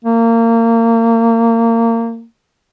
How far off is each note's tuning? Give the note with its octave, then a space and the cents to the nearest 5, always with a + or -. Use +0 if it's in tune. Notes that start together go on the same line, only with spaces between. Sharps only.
A#3 -25